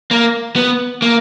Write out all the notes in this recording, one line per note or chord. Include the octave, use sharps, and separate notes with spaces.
A#3
B3
A#3